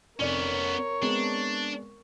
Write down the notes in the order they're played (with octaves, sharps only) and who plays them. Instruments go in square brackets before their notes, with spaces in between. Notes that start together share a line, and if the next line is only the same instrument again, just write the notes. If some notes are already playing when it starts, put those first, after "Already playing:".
[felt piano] F1 D5 [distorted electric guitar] B3 C#4 [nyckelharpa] A#4 C#5
[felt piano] G#3 B3 C4 [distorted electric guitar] D4